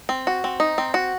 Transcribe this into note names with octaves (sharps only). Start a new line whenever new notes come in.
C4
F#4
C4
D#4
C4
F#4